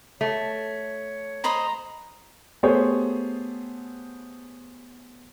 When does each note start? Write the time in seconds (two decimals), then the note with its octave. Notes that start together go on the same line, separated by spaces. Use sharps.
0.21 A3 C#5
1.44 C5 D#5 A#5 B5
2.63 A3 B3 G4 G#4 C5 C#5